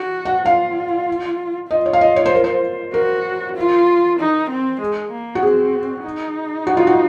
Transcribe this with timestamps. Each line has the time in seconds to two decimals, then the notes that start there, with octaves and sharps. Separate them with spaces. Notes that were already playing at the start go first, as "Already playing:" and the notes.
Already playing: F#4
0.25 F#5
0.46 F4 F5
1.70 F4 D#5
1.86 C#5
1.93 F5
2.01 D#5
2.16 C#5
2.26 C5
2.35 A#4
2.44 C5
2.93 F#4 A#4
3.57 F4
4.19 D#4
4.50 C4
4.80 G#3
5.11 A#3
5.35 F#4
5.42 C4 G#4
6.04 D#4
6.67 F#4
6.77 F4
6.87 F#4